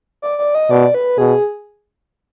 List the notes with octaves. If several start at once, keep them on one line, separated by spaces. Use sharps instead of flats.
D5
D5
D#5
B2 D5
B4
B2 G#4